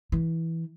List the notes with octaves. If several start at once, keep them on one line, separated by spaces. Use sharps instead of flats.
E3